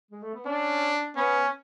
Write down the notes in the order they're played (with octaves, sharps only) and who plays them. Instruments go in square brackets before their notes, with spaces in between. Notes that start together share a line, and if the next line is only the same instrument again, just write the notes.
[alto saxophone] G#3
A3
B3
[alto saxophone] C#4 [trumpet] D4
[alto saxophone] B3 [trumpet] C#4